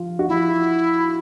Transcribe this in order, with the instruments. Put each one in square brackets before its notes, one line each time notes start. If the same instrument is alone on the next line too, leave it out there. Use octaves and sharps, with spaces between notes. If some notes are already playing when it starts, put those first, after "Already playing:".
Already playing: [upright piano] F3 F4
F#4
[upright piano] F3 F4 [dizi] E4